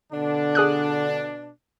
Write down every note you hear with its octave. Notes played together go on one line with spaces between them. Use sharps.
B2 D3 D4
G#4 D#6 F#6